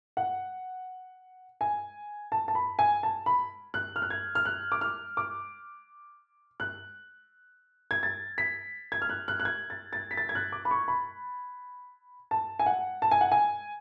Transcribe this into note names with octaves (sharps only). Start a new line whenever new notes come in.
F#5
G#5
A5
A5
B5
G#5
A5
B5
F#6
F6
F#6
G#6
F6
F#6
D6
F6
D6
F#6
G#6
A6
B6
G#6
F6
F#6
F#6
F#6
G#6
A6
A6
B6
A6
G#6
F#6
D6
B5
C#6
B5
A5
G#5
F#5
A5
G#5
F#5
G#5